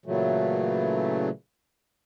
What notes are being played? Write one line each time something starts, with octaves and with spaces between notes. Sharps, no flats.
A#2 C#3 E3 F#3 A3